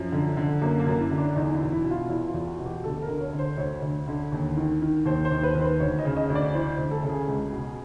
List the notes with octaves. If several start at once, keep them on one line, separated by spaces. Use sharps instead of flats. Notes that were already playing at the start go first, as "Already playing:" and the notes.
Already playing: F#2 F3
D3
D3
F#2 A#3
A#3
F#2
E4
D3
D4
E2 D#4
E4
B2
E4
B2
F4
E2 E4
F4
E2
F#4
B2
G4
D2 A4
A#4
D3
C#5
D3
C5
D2 C#5
D2
D3
D#2
D#3
D#3
D#2 C5
C5
D#2
B4
D#3
C5
D2 C#5
D#5
C#3
D#5
D2
D5
E3 C5
D2
A4
C#3
G#4
C#2
B2